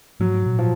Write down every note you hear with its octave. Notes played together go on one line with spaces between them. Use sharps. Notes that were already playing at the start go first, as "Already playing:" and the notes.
G#2 F#3
A#2
F3